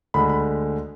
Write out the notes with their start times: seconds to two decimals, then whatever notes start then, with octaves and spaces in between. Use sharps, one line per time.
0.14 D2 D3 G#3 B5
0.29 B5